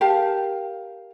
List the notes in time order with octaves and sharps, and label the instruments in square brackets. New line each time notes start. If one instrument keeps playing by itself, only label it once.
[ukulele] G4 A#4 F5 A5